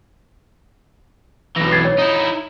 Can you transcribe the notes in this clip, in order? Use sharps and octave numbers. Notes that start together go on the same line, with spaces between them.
B1 E3 A#6
G#6 A6 C7
C#5
D#4 E4